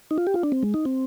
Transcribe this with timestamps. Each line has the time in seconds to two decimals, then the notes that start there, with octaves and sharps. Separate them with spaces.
0.11 D#4
0.18 F4
0.27 G4
0.34 F4
0.43 D4
0.52 C4
0.63 G#3
0.74 D#4
0.85 C4